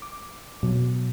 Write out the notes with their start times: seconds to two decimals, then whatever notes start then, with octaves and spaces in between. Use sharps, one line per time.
0.02 D6
0.63 B2 F#3